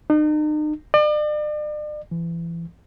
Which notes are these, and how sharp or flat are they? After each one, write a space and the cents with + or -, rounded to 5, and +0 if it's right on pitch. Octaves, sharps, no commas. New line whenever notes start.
D#4 -40
D5 +40
E3 +30